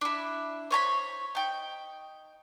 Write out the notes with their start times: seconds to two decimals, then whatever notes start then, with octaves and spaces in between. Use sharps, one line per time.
0.01 D4 E4
0.71 C5 C#5 A#5 B5
1.35 D#4 G5